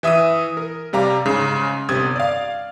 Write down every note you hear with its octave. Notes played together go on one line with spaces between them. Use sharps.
E3 E5 D#6 E6 D#7
A#4
C3 G3 F5 A#5 D6
G#2 C#3
G1 C3 D#6 G#6
D5 F5